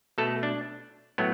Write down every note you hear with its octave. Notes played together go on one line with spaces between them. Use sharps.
B2 A3 A4
D4
A2 F#3 A3 B3